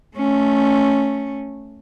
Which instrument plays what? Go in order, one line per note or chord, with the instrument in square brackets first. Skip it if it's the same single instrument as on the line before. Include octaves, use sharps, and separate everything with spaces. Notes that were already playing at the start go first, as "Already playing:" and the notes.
[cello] A3 C#4